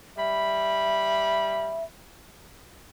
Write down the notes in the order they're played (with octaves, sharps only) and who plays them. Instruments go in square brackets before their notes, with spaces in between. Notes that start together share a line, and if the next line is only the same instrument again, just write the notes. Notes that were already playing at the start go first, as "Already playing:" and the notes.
[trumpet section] G3 B5 [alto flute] E5